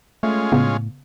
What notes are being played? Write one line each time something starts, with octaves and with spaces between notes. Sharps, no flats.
G#3 A3 C#4 F4
A2 C#3 B3 F5